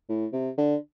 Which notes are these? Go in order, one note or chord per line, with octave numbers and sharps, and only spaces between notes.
A2
C3
D3